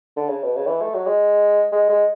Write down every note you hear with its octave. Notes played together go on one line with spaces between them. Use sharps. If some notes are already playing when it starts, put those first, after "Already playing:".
D3
C#3
B2
C#3
E3
A3
F#3
G#3
G#3
G#3